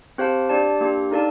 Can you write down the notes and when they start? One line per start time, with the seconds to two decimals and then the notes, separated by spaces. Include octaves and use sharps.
0.18 C4 G4 C5 F5 A5
0.49 D4 G4 D5 A5
0.81 A#3 D4 G4
1.11 D#4 A4 D5 F5 A5